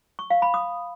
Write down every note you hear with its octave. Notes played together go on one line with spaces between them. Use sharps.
C#6
F5
B5
D#6